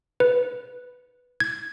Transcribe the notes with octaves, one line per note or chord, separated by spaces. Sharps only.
B4
G#6